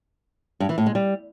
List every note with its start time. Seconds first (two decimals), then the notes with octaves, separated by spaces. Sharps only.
0.60 G2
0.69 E3
0.78 A2
0.86 G#3
0.95 G3